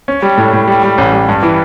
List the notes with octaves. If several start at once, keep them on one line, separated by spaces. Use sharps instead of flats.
C#4
G3
A2
A2
G3
G3
A1
G3
G2
E3